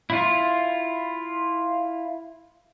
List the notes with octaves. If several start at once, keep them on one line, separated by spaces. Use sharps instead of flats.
E4 F4